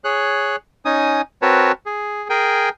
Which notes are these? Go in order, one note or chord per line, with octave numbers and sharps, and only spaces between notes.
G#4 C#5 F#6
C#4 D#4 G#5 D#6
C4 F#4 A#4 B4 C#5 A5
G#4
G#4 A#4 G5 G#5